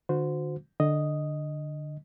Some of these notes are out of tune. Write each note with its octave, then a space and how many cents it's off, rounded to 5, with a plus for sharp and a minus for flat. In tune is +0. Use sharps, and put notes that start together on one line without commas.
D3 +30 F#4 -30 C5 -20
D3 +15 D#5 +0